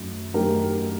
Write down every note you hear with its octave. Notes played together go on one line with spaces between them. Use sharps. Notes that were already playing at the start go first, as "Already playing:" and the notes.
Already playing: F#2 D#3 F#3 A3
F#2 D#3 F#3 A3 G4 A#4